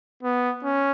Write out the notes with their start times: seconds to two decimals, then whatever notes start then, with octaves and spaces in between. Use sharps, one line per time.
0.23 B3
0.64 C#4